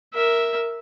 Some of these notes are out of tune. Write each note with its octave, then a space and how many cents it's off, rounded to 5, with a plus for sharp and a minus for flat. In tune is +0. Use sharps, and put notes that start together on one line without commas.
A#4 +0 E5 -5